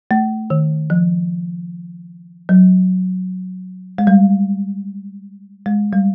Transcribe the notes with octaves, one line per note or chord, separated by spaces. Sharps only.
A3
D#3
F3
F#3
G#3
G3
G#3
G3